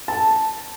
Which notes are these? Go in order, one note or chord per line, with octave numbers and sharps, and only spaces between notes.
A5